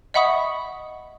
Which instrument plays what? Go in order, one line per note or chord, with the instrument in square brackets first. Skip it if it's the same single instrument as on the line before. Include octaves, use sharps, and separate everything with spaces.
[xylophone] D#5 E5 F#5 B5 C#6 D#6